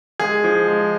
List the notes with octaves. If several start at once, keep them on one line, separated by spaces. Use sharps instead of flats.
G#3 G#4
F3
G#3